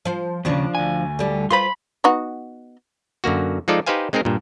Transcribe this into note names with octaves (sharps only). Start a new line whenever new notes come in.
F3 C5
D#2 C#3 F3 D4 F4
D2 G#5
D3 G3
F4 B4 C5 B5 C6
B3 D#4 F#4
F#2 D3 A#3 F#4
F3 G#3 D#4 F4 A4 D5
D#4 G4 B4 C5 F5 G#5
G#3 C4 D#4 G#4 A#4
G2 A#2